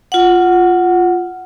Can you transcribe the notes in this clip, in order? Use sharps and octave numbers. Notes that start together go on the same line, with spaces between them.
F4 F#5